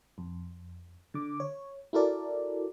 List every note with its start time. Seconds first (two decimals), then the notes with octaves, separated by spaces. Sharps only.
0.18 F2
1.14 D3 D6
1.40 C#5
1.93 E4 F#4 A4 A#4 D5